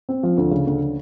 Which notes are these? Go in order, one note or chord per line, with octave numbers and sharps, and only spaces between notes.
C4
F3
D2
C#3
D2